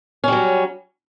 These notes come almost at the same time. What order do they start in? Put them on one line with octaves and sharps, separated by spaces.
C#4 G3 F#3